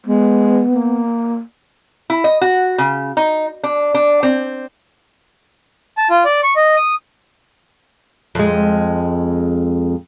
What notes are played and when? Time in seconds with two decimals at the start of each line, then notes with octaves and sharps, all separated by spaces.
0.06 G#3 B3
0.71 A#3
2.10 E4
2.24 D#5
2.41 F#4
2.78 C#3
3.17 D#4
3.63 D4
3.94 D4
4.23 C4
5.98 A5
6.10 F4
6.25 D5
6.43 C#6
6.56 D#5
6.76 D#6
8.35 F2 G#3